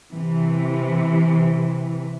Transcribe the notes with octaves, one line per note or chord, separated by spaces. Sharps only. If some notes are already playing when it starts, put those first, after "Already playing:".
C3 E3